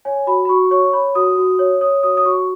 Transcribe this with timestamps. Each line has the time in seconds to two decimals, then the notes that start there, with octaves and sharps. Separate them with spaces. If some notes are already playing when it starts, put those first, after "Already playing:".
0.05 C#5 G#5
0.27 F#4 B5
0.45 B5
0.49 F#4 C#6
0.71 C#5 C#6
0.93 C#5 B5
1.15 F#4 D#6
1.38 F#4
1.59 C#5
1.81 C#5 D#6
2.03 F#4 D#6
2.17 D#6
2.25 F#4 C#6